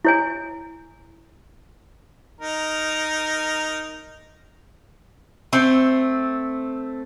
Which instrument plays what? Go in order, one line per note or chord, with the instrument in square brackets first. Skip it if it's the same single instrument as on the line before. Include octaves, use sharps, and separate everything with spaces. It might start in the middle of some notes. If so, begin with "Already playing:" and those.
[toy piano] E4 C#5 G#5
[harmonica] D#4 A#4
[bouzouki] A3 C4